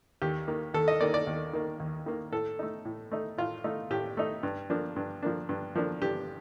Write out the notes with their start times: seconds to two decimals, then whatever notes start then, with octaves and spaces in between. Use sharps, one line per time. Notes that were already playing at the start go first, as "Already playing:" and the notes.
0.22 D#2 G4
0.48 D#3 A#3
0.74 D#2 A4
0.88 D#5
1.01 D#3 A#3 D5
1.14 D5
1.27 D#2
1.53 D#3 A#3
1.80 D#2
2.06 D#3 A#3
2.32 A2 A4
2.59 A3 D#4
2.85 A2
3.11 A3 D#4
3.38 A2 F4
3.64 A3 D#4
3.91 A2 G4
4.17 A3 D#4
4.43 G2
4.70 F3 A#3 D4
4.96 G2
5.23 F3 A#3 D4
5.49 G2
5.75 F3 A#3 D4
6.02 G2 G4